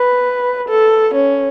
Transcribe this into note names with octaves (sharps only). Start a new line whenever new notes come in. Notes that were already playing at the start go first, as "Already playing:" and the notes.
Already playing: B4
A4
C#4